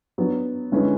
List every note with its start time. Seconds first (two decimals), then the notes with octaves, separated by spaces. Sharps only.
0.18 F#3 B3 D4
0.72 D3 G#3 C#4 E4 B4